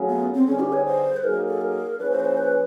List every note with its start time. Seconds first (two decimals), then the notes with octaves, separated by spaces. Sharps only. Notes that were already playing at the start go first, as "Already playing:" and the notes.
Already playing: F#3 A3 C#4 F4 G#4
0.09 B3
0.35 C4
0.47 D3 G3 B3 C#4 D#4 G#4
0.60 G4
0.73 C#5
0.86 C5
1.17 B4
1.24 F#3 A#3 D#4 G#4 A#4
1.48 A4
1.61 A#4
1.99 F3 A#3 C#4 E4 G#4 B4
2.11 C5
2.20 B4
2.25 C5
2.38 B4